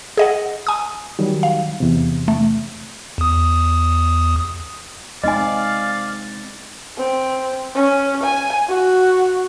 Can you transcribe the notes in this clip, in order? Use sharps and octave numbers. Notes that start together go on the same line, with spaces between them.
G#4 D#5 F#5
G#5 D#6
D#3 F#3 G3
F5
E2 C3
A3
E2 D#6
G#3 C4 D#4 D5 D#5 F5 G#5
C4
C#4
G#5
F#4